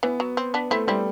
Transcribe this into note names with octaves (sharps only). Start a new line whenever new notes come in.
E3 B3
F#3
C4
B3 D4
A3 C4 E4
G3 C4 E4